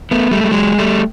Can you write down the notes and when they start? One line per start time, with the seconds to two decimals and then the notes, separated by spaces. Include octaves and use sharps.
0.11 A3 B3
0.31 G3 A3
0.44 G3
0.51 F#3 G#3
0.78 G3 A3